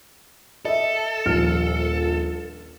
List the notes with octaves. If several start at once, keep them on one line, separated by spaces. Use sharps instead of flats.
A4 D#5 E5
D#1 A#1 F6